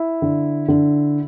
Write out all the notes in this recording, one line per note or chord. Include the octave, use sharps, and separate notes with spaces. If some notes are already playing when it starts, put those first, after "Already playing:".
Already playing: E4
D3
D3